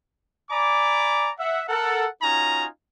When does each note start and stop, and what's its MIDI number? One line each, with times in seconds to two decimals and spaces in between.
0.51 1.29 74
0.51 1.29 80
0.51 1.29 82
0.51 1.29 83
0.51 1.29 86
1.39 1.62 76
1.39 1.62 78
1.68 2.07 69
1.68 2.07 70
1.68 2.07 78
2.22 2.66 61
2.22 2.66 63
2.22 2.66 65
2.22 2.66 66
2.22 2.66 80
2.22 2.66 82